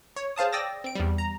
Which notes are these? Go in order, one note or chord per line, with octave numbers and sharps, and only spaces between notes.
C#5
G#4 C5 F5 A5 D#6
D5 G5 D#6 E6 A6 A#6
C4 D7
E2 G3
A#5